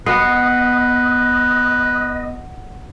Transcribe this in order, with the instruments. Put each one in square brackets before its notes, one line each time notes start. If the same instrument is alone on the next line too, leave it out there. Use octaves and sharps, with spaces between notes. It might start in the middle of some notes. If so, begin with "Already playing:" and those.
[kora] B3 [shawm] B4 [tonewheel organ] D#5 [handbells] F#5 C7